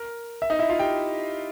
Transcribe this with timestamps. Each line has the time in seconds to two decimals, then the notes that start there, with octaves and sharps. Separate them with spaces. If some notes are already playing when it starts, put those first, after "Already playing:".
Already playing: A#4
0.42 E5
0.50 D#4 D#5
0.59 E4 E5
0.69 F4 F5
0.79 G4 G5